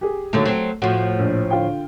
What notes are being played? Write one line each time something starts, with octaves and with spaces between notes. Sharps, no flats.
G4 G#4
D#2 D3 F#3 A3
F#3 C4
A2 F3 F#4
A#1
D3 F4 G5